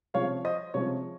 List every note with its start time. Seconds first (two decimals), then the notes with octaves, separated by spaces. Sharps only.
0.14 C3 F3 G#3 C#4 C#5 F5
0.45 C5 D#5
0.74 C3 F3 G#3 C#4 C#5